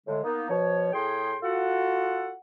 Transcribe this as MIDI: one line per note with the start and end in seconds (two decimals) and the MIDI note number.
0.07 0.20 45
0.07 0.20 50
0.07 0.20 56
0.24 0.49 58
0.24 0.49 59
0.24 0.49 63
0.50 0.91 47
0.50 0.91 53
0.50 0.91 73
0.93 1.34 45
0.93 1.34 68
0.93 1.34 79
0.93 1.34 84
1.43 2.33 65
1.43 2.33 66
1.43 2.33 69
1.43 2.33 78